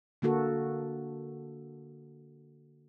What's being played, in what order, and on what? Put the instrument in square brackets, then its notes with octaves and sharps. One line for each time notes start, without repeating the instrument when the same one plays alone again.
[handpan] D3 A#3 F#4 A4